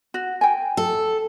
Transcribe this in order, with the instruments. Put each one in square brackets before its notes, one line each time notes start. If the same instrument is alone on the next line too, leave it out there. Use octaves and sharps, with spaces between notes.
[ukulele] F#4
G5 G#5
[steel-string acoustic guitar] A4